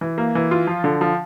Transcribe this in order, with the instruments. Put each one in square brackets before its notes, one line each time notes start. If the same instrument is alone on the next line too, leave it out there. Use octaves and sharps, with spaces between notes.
[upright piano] E3
A#3
E3
F4
F3
D3
F3